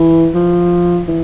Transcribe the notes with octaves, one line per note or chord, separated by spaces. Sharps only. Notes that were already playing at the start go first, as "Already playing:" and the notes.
Already playing: E3
F3
E3